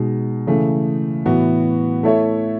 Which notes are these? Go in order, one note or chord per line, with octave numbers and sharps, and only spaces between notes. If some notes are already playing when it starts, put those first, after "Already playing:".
Already playing: B2 G#3 D#4
C#3 E3 A3
A2 E3 B3 F#4
A3 E4 A4 C#5 E5